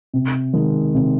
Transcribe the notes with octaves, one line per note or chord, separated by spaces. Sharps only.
C3
D#3 G#3
C3